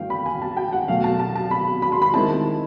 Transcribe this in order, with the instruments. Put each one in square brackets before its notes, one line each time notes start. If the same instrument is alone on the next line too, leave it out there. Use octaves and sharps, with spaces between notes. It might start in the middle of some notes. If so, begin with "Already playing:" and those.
Already playing: [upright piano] G2 E3 A3 F5 G5
B5
G#5
A5
G5
F#5
B2 F#3 A3 F5
A5
A5
A5
B5
B5
C6
B5
D#3 G#3 C4 E4 A5